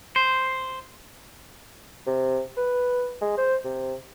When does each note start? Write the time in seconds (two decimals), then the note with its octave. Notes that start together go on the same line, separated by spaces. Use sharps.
0.16 C5
2.07 C3
2.57 B4
3.21 G#3
3.38 C5
3.65 C3